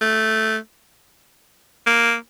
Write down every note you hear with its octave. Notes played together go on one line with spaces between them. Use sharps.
A3
A#3